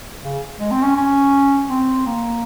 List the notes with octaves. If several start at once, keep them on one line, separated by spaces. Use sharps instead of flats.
C#3
G#3
C4
C#4
C#4
C4
A#3